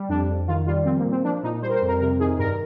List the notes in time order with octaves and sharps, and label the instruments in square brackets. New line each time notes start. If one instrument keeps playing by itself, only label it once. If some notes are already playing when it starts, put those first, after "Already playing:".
Already playing: [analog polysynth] G3
F2 D4
F2
D#3 F4
G3 F4
F3 C4
A#3
A#2
C4
F3 D4
A#2 D#4
G3 C5
A#4
C5
F2
A#4
C3 A#4
D#3 G#4
G2 A#4